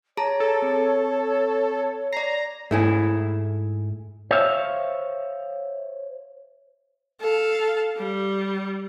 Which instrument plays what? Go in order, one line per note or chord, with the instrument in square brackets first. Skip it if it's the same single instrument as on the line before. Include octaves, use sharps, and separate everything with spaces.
[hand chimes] G#4 A5 A#5 [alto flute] C#5
[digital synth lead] A4
[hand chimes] C4
[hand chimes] D5 C7 [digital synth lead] A#5
[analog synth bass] G#2 [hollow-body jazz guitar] A3 E4 G#4
[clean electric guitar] C5 C#5 E5 F5
[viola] A4 F5
G3